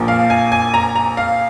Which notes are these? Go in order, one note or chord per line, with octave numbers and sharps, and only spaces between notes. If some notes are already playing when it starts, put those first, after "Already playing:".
Already playing: A#1 A#2 F3 A#3
F5
G#5
G#5
A#5
A#5
F5